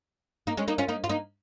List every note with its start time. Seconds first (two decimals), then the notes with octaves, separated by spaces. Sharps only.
0.47 A#3 D#4
0.57 G#3 C#4
0.68 A#3 D#4
0.78 C#4 F4
0.88 A#3 D#4
1.04 F4
1.09 A#3 D#4